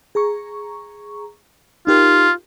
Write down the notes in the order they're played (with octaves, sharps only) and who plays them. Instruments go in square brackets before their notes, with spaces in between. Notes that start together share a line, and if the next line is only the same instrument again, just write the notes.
[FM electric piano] G#4 A#5 C#6
[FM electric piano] D#4 G4 A#4 [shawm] F4